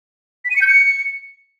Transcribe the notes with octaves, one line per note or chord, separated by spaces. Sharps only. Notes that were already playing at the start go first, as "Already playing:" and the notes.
B6
D#7
C#7
G6
C#7